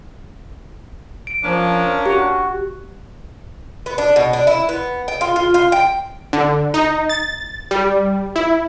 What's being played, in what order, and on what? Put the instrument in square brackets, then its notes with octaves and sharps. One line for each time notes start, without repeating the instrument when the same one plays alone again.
[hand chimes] D7
[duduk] F3 [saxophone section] A#3 C#4 D4
[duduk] F#4 [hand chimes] G4
[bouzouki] B3
D4
B2
D4
E4
B3
G5
F4
F4
F4
G5
[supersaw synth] D3
D#4
A6
G3
E4